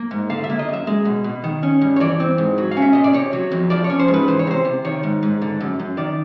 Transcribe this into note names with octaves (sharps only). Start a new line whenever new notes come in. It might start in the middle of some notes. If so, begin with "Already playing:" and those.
Already playing: A#3
G#2
D3 F5
E5
A#3
D#5
F#2 E5
G#3
B2
B2
D#3
C#4
G2
C#5
E3 D5
C4
G#2
F#3
F5
C#4
E5
A#2 D#5
D5
C3 C#5
F#3
F2
F3 D5
C#5
C#4
C5
G#2
B4
E3 C5
C#5
C3 C5
C3
D#3 C#5
G#2
G#2
D3
F#2
F#2
D#3 D5